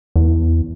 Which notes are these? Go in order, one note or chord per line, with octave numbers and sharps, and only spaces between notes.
E2